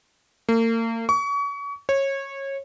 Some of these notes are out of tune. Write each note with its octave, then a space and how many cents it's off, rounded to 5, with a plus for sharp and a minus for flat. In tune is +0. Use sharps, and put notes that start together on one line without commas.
A#3 -40
C#6 +35
C#5 -20